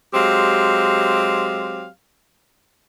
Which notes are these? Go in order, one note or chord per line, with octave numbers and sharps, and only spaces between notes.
F#3 G#3 C4 G4 F5